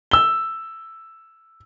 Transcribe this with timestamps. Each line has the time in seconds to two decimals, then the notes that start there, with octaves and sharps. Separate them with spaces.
0.11 E6 G7